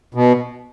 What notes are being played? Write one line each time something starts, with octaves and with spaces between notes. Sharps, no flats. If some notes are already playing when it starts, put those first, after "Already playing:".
B2